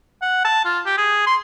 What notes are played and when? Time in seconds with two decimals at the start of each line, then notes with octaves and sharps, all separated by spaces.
0.22 F#5
0.45 A5
0.65 F4
0.86 G4
0.98 G#4
1.26 C6